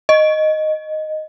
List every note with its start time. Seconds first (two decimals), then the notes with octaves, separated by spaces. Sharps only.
0.09 D#5